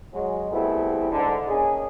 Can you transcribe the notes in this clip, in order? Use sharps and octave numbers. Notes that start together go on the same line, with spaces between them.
F#3 G#3
G3 A3 B3 C4 E4 G#4
G#2 D3
A#3 C#4 D#4 G#4